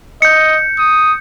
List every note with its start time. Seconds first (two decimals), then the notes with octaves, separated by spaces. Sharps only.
0.22 D#5 G6 C#7
0.79 D#6